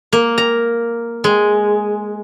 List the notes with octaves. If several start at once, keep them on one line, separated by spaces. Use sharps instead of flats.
A#3
A#5
G#3